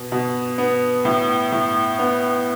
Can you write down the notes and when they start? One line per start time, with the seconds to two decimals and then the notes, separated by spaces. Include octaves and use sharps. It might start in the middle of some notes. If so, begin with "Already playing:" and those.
Already playing: B2 B3
0.12 B2
0.58 B3
1.05 A2
1.52 A2
1.99 B3